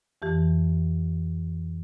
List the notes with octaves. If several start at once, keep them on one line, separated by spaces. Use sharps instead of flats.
F2 E3 G4